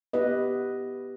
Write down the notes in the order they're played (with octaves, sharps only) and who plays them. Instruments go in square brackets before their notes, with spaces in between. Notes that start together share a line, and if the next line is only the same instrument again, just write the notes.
[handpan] B3 E4 G4 B4 D#5